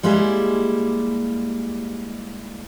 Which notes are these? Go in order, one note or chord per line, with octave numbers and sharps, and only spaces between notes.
G3 G#3 A#3 E4 G4 G#4